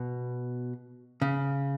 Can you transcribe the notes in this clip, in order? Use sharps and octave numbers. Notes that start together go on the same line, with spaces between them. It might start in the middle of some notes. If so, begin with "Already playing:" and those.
Already playing: B2
C#3